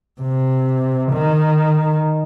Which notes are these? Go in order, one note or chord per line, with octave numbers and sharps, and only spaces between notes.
C3
D#3